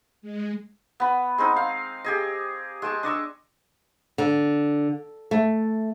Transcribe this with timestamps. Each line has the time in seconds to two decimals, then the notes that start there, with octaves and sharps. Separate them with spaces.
0.22 G#3
1.00 B3 B5
1.38 G#3 C4 D#4
1.56 F5
2.04 G4 G#4 D#5
2.82 G#3 G5 A5 C#6
3.03 D4 D#5 C#6 E6
4.18 D3
5.31 A3